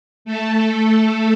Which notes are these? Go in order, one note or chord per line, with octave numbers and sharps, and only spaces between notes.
A3 A4